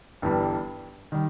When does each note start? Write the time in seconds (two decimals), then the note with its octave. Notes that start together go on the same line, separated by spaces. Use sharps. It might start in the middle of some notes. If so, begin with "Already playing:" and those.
0.22 G1 G2 E3 G3
1.12 D#3 G3